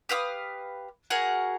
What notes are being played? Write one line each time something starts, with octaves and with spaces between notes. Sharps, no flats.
G4 B4 F5 D#6
F#4 G#4 A#4 F#5